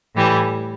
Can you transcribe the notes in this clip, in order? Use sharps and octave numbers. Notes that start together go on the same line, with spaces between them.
A2 E3 G3